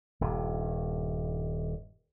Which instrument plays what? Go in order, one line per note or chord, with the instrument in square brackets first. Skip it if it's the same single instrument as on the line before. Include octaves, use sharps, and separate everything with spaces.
[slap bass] D#1 G2